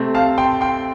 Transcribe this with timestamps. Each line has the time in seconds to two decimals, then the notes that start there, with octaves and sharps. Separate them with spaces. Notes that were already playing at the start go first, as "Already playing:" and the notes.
Already playing: C3 A3 C4
0.15 F5 A5
0.38 G5 C6
0.61 G5 C6